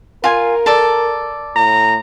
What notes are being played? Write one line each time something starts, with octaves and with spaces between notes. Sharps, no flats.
F4 A#4 G#5
A4 D5
A2 A#5